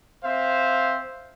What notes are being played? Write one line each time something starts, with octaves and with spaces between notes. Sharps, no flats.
C4 C5 E5 F5